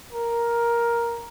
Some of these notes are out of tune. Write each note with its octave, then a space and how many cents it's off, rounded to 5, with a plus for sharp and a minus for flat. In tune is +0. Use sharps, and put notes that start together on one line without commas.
A#4 +10